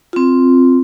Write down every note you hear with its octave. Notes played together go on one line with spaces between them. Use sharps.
C4 F4